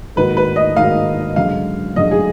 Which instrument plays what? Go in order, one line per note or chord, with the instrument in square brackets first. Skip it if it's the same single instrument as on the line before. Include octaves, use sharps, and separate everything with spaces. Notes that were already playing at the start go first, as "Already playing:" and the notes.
[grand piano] G#2 D#3 A#3 D#4 F#4 [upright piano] B4
[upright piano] B4
D#5
[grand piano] G#2 D#3 A#3 D#4 F#4 [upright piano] F5
[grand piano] F#2 D3 G#3 [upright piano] F5
[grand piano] F#2 D3 G#3 [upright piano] D#5
[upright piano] G#4